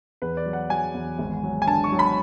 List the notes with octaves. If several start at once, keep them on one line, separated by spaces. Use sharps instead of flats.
E2 B4
D5
F#3
F#5
F#3 G#5
E2
G#1
F#3
G#5
D3 A5
C#6
F#3
B5